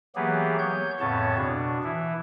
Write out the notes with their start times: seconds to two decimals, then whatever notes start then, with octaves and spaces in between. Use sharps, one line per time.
0.16 E3 F#3 A#3 B3 G4 G#4
0.59 C#5 G6
1.00 F2 A2 C#3 B3 C#5 A5
1.37 B2 D4
1.83 E3 E4